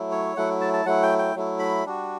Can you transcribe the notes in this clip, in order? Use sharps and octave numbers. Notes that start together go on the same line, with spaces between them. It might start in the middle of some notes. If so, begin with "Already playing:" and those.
Already playing: F#3 A3 E4
C#5
F#3 A3 E4 F#5
A5
A5
F#3 A3 E4 F#5
G5
G5
F#3 A3 E4
B5
G3 D4 F#4